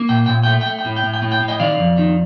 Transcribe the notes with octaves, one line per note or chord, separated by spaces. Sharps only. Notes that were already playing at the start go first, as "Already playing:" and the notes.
Already playing: A#3
A#2 G5
A#2 G5
A3 G5
G5
A3
G5
A2
G5
A2
G5
A2
G5
A2
D#5 G5
D#3 D5 F5
F2
D#3